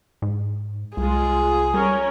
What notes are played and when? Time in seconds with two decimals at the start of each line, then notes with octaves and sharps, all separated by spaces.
0.22 G#2
0.97 C2 G#3 F4 G#4
1.74 G3 C#4 A#4 C#5